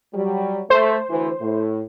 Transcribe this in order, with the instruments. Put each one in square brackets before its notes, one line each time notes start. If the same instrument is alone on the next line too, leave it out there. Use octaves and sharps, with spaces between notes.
[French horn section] F#3 G3
[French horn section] A3 [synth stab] C5
[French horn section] D2 E3
A2